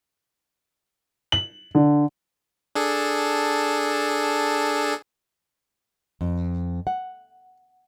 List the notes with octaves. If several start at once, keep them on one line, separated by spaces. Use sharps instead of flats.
F#7
D3
D4 G#4 A4
F2
F#5